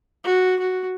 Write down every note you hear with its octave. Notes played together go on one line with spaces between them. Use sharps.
F#4
F#4